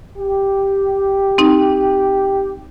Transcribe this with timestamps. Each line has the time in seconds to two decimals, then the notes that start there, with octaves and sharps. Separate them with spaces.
0.17 G4
1.38 C4 D#4